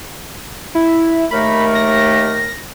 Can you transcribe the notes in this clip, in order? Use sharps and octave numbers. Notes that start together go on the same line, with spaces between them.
E4
D#2 A3 A#4 B5
A#6